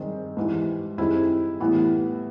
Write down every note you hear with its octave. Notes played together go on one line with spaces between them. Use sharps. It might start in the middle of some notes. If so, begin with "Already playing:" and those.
Already playing: G2 D#3 G#3 C4
G#2 E3 G3
D#3 G3 C4 E4 G#4
A2 E3 G3 B3